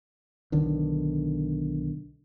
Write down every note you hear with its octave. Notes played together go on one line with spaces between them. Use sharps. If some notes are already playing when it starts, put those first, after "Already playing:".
B1 D3 D#3